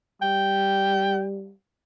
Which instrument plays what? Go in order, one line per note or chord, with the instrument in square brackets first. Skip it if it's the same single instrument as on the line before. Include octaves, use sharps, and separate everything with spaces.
[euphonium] G3 [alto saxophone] G5